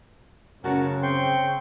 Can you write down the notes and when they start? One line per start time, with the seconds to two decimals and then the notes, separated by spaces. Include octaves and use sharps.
0.64 F#2 C#3 C#4 F#4 A#4 A5
1.03 C4 G5 C6 C#6